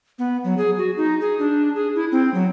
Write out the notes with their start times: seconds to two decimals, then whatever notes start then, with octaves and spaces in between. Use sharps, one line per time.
0.19 B3
0.44 F#3
0.58 G#4
0.78 F#4
0.97 D#4
1.21 G#4
1.39 D4
1.75 G#4
1.95 E4
2.12 C4
2.34 F#3